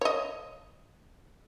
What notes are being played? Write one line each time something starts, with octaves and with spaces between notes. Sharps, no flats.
C#5 D#5